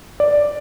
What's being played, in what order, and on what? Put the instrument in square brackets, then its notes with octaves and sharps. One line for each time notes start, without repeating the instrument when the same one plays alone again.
[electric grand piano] D5